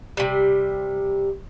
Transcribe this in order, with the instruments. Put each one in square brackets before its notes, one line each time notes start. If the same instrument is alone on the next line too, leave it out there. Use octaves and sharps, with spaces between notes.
[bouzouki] C3 G3